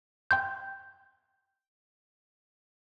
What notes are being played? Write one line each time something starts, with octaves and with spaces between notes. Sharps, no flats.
G5 C6 G6